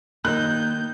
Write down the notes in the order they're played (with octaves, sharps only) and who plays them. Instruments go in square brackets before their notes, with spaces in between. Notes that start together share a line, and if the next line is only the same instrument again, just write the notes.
[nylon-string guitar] D#3 D#4 [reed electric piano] A#3 [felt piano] F#6 [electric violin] G6